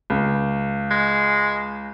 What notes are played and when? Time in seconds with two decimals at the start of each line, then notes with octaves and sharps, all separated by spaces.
0.10 C#2
0.91 G#3